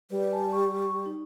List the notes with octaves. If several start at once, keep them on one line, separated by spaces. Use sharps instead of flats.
G3 B4 D5
G#5 A5
C#6
D#4